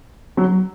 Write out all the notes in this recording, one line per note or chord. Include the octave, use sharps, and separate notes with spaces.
F#3